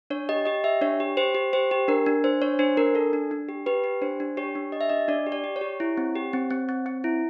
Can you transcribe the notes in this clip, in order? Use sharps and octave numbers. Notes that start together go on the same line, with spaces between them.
D4 C#5
G4 D#5
G4 D#5
G4 E5
D4 C#5
G4
G4 C5
G4
G4 C5
G4
D4 A#4
D4
D4 C5
D4 C#5
D4 C5
D4 A#4
D4 A4
D4
D4
G4
G4 B4
G4
D4 C5
D4
G4 C#5
D4
G4 D#5
E5
D4 D#5
D4 D5
G4
D5
G4
C#5
G4
E4
C4
G4
C4
C4
C4
C4
E4